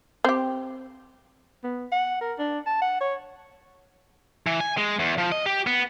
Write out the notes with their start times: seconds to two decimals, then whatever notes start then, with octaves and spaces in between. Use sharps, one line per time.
0.24 C4 G4
1.64 B3
1.92 F#5
2.21 A#4
2.39 D4
2.66 A5
2.82 F#5
3.01 C#5
4.47 E3
4.61 G#5
4.77 G#3
4.99 E2
5.18 F3
5.32 D#5
5.46 G4
5.67 B3